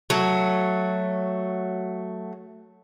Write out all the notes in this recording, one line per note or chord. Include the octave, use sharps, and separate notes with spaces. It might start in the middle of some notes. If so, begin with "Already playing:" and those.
F#3 A3